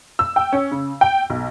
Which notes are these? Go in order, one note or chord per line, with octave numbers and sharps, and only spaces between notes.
E6
G5
C#4
C#3
G5
B1